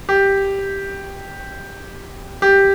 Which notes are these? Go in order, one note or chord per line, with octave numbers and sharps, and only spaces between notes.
G4
G4